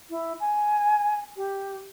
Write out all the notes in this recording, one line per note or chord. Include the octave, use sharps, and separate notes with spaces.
E4
G#5
G4